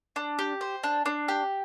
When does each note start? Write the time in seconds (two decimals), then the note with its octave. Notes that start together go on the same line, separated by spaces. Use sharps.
0.16 D4
0.39 G4
0.61 C5
0.83 D4
1.06 D4
1.28 G4